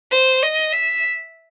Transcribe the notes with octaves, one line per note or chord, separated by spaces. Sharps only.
C5
D#5
E5